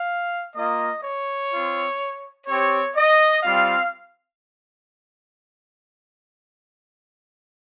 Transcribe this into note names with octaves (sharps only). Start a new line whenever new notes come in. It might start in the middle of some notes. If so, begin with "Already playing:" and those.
Already playing: F5
A#3 F4 D#5
C#5
C4 F4
C4 G4 C#5
D#5
G3 C4 F4 F5